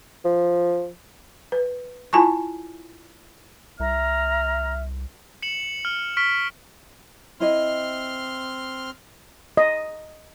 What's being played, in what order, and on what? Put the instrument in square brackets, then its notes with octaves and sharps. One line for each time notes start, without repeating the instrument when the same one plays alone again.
[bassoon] F3
[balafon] B4
E4 F4 G#5 A5 C#6
[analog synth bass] C2 [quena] E5 [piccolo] A#5 [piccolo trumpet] F6
[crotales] C#7 E7 F#7
F6
C#6 F6 B6 D7
[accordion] C4 C6 F6 [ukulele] E4 D#5
[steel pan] D#5